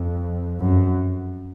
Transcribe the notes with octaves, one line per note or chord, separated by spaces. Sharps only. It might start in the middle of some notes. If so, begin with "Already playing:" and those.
Already playing: F2
F#2